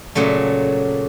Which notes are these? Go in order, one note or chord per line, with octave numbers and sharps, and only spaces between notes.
A#2 C#3 F#3 A3